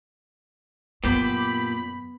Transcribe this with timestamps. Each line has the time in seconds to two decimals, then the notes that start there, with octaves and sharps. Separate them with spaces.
1.04 F#2 A#2 C#3 B3 G4 B5